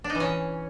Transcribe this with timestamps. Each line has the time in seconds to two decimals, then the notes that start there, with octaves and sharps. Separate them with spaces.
0.04 D4
0.10 D#4
0.15 E3
0.20 C#4